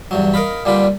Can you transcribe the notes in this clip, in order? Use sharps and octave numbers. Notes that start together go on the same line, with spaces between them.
E2 G2 F#3
A#4 D#5 F5 B5
A#2 D3 G3 F4 B5